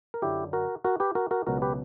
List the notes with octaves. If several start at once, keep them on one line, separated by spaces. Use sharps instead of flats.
A#4
F#2 D3 F#3 E4 G4
F#4 A#4
F#4 A#4
G4 B4
F#4 A#4
F#4 A#4
C#2 B2 F#3 F#4 A#4
G4 B4